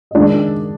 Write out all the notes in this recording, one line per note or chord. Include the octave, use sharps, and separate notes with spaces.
D#5
D#3 G#3 D4 D5